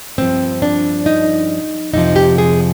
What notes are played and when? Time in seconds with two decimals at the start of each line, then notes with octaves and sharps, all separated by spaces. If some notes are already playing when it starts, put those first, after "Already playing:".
0.18 G2 F3 C4
0.62 D4
1.06 D#4
1.94 F2 C3 F3 D#4
2.16 G4
2.38 G#4